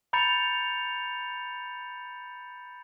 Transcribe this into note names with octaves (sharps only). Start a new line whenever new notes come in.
A#5 B5 G6 A6 C#7 F7